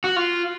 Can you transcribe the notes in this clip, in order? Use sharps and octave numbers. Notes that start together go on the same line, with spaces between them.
F#4
F4